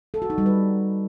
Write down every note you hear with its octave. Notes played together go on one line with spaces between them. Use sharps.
A4
F#4
D#4
G3
B4